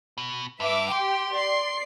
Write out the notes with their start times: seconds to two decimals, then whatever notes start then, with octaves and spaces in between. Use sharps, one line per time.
0.18 B2
0.60 G2 B4 E5 D6
0.92 G4 G5 C6
1.35 D5 C7